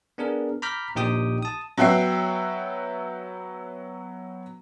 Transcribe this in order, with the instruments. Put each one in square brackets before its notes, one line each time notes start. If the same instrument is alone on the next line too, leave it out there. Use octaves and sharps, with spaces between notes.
[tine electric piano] B3 D4 G#4 A#4
A#5 B5 D6 F6 G6 B6
A#1 A#2 D#4 G4 G5 D#6
A5 D#6
[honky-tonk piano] F#3 B3 F#4 E5 G5 C7